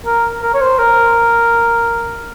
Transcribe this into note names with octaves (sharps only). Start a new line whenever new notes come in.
A#4
A#4
C#5
C5
A#4